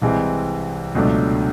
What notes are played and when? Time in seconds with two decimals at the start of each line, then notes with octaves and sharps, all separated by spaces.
0.02 C2 C3 E3 G#3 C4
0.95 C#2 B2 F#3 A3 D4